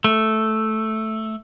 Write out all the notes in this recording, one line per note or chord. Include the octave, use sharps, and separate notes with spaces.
A3